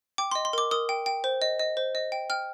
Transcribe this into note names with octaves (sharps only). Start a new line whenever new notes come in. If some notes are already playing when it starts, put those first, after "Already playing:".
G5 D6
D#5 C6
C6
A#4 D6
A#4 D#6
G5
G5
C5
D#5
D#5
C5
D#5
G5
G5 F6